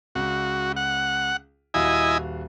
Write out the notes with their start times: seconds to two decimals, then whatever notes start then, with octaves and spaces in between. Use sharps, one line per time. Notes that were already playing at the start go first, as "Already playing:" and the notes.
0.15 C#2 F#4
0.76 F#5
1.74 D#1 E4 F#4 D#5 F5 G#5